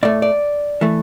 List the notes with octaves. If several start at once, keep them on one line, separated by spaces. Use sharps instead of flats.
A2 A3 D5
D5
E3 A3